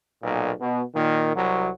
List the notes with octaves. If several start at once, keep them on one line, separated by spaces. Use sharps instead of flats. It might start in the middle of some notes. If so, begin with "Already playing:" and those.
B1 A#2
B2
A#2 D#3
C2 F#3